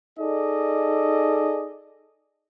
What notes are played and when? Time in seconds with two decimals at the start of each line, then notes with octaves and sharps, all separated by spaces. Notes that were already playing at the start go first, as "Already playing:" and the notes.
0.19 D#4 G#4 A4 D5 D#5